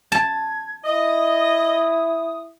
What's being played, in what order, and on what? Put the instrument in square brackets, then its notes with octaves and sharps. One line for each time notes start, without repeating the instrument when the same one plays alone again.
[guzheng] A5 [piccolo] G#6
[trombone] E4 [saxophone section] D#5 [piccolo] D#6